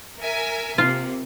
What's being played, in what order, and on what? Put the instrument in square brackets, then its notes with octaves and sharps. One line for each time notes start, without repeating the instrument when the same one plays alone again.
[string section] A#4 E5 G#5
[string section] C3 A#3 [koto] F4